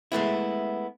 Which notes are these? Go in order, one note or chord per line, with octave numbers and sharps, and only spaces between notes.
G#3 A3 B3 E4